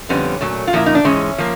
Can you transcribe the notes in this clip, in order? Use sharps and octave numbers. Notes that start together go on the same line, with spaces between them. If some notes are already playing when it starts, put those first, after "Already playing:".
F2 D3 G3 B3 C#4
A#2 F#3 A3
F4
A#2 F3 A#3 E4
D#4
D4
G#2 E3 G#3 C#4
F3 A#3